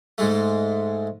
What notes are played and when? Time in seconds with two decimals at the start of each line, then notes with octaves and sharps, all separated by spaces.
0.18 G#2 G#3 A3